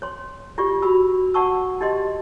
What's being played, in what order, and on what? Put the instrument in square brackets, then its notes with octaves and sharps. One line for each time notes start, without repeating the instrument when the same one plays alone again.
[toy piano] C#5 C6
F4 G4 D5 C#6
F#4 B5 E6
D5 F#5 A5 C#6 E6
D#4 G4 D5 D#5 C6